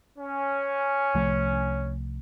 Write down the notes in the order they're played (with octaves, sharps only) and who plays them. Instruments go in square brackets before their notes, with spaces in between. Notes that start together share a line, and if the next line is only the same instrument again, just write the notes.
[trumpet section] C#4
[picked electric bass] C2 F3 A3